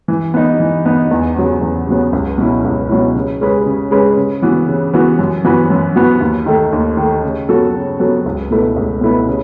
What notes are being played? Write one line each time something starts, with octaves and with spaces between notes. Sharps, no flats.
E3
B3 D#4
E3
B3 D#4
E2
C#3 F#3 B3
E2
C#3 F#3 B3
C#2
B2 F#3 C#4 E4
C#2
B2 F#3 C#4 E4
C#3
G#3 C#4 G#4 B4
C#3
G#3 C#4 G#4 B4
C#3
E3 B3 F#4
C#3
E3 B3 F#4
F#2
E3 B3 F#4 B4
F#2
E3 B3 F#4 B4
D#2
D#3 A3
D#2
D#3 A3
C#3
F#3 B3 F#4 A4
C#3
F#3 B3 F#4 A4
C#2
B2 A3 E4 B4
C#2
B2 A3 E4 B4
C#3